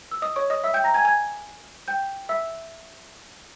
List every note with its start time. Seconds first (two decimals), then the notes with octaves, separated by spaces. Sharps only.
0.11 E6
0.22 D#5 D#6
0.36 C#5 C#6
0.50 D#5 D#6
0.64 E5 E6
0.74 G5 G6
0.84 A#5 A#6
0.94 G#5 G#6
1.05 G#5 G#6
1.88 G5 G6
2.29 E5 E6